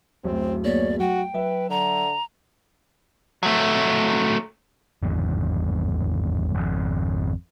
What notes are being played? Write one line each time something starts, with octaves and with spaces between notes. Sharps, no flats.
D1 F#2 A2 C4
A#3 B3 G#4 C#5 D5
F#3 F#4 G5
F#3 B4 E5
D3 A#5
F#3 A3
G#1 E2 G2
G#1 F2